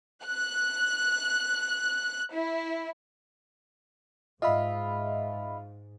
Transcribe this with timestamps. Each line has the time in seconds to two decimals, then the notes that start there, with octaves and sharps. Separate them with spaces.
0.24 F#6
2.32 E4
4.42 G#2 F4 D#5 E5 B5